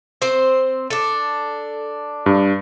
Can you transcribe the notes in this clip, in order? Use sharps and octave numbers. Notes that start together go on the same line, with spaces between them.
C4 C5
D4 A4
G2